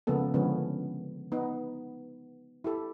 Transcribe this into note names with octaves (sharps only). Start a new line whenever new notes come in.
C#3 F3 G#3 A#3 B3 A4
D3 F3 G#3 B3 C#4
B3 D#4
E4 G4 A4